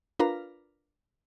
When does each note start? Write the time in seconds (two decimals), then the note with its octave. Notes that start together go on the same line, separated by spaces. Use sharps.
0.19 D4 F4 A#4 B4 F5 A#5